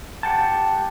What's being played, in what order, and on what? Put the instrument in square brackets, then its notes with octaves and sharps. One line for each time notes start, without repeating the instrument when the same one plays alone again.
[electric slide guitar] G4 F#5 G5 A5